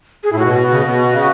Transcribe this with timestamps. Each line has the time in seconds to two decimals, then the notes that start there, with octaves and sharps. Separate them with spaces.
0.23 G#4
0.33 A2 E4
0.39 B2 F#4
0.53 F#4
0.68 C#3 F#4
0.83 B2
1.12 C#3